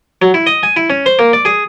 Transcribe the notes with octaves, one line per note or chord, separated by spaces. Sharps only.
F#3
E4
D#5
G#5
E4
C#4
C5
A#3
D5
G#4